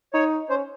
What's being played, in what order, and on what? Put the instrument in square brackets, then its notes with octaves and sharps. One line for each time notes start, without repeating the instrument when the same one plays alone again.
[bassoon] D#4 [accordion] C#5
[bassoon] C#4 [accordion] C5